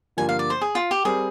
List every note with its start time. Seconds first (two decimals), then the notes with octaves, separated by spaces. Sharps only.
0.17 G2 D3 F3 A#3 F4 G#5
0.29 F5
0.39 D5
0.50 C5
0.61 G#4
0.75 F4
0.91 G4
1.05 G3 C4 G4 G#4 A#4